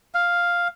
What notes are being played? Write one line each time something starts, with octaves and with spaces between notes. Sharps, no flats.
F5